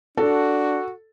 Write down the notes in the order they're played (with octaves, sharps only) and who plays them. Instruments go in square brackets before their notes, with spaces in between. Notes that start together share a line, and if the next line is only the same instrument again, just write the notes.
[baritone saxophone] D4 [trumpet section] F#4 [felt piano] A4